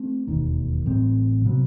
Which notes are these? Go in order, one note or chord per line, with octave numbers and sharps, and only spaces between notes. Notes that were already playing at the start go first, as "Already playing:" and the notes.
Already playing: A3 C4
E1 D#2 D#3
A1 A2 G3 C4
C3 F#3 B3